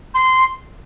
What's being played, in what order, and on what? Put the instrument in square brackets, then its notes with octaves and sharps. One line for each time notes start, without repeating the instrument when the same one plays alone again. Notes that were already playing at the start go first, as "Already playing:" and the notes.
[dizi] C6